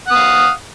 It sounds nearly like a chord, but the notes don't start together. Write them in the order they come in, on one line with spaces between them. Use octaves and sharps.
F#5 D#6 F5